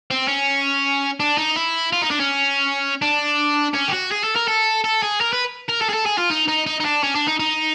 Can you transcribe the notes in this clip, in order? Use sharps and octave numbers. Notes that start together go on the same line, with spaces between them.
C4
C#4
D4
D#4
E4
F4
D#4
D4
C#4
D4
C#4
G4
F#4
G#4
A4
A#4
A4
A4
G#4
A#4
B4
A#4
A4
G#4
A4
G#4
F4
D#4
D#4
D#4
D#4
D4
C#4
D4
D#4
D#4